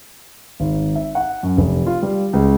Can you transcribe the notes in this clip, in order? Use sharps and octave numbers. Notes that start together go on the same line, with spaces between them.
G#1
E5
F#5
F#2
F1
F4
G3
C#2